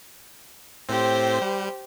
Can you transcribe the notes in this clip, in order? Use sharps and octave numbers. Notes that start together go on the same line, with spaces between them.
A2 C4 G4 C5
G3